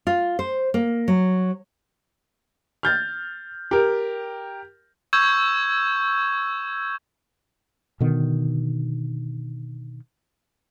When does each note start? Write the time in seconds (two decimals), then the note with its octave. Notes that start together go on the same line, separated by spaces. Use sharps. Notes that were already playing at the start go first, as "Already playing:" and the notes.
0.07 F4
0.39 C5
0.74 A#3
1.08 F#3
2.83 F6 G6 A6
3.71 G4 A#4
5.13 C#6 E6 G6 G#6 E7
8.00 B2 D3 D#3 B3